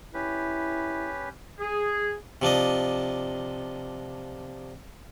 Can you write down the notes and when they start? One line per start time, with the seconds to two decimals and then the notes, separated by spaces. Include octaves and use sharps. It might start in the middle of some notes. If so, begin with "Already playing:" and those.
0.14 C#4 E4 G4 B4
1.60 G#4
2.42 C3 F3 D4 D#5